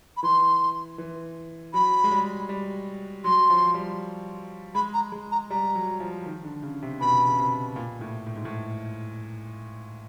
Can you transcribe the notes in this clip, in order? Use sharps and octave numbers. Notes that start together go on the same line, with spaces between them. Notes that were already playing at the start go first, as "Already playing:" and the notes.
B5
E3 C6
E3
F#3 B5
G#3
G3
G3
F#3 C6
F3
G3
G#3 B5
A#5
G#3
A#5
G3 A#5
F#3
F3
D#3
D3
C#3
C3
B2 B5
C#3
C3
A#2
A2
A2
G#2
A2